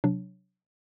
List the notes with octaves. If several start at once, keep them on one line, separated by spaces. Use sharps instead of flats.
C3 F#3 D4